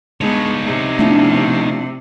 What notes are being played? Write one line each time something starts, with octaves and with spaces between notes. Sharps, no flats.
G2 G#3 B3 D#4 C#5
C3
F3 A3 B3 D4 E4